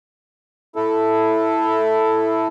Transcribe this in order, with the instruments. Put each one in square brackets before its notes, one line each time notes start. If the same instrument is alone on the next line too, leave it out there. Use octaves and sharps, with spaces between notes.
[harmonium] E4 A4